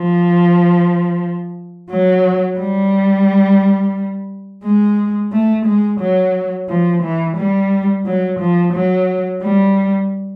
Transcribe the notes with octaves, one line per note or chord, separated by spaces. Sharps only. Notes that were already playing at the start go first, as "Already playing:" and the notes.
Already playing: F3
F#3
G3
G#3
A3
G#3
F#3
F3
E3
G3
F#3
F3
F#3
G3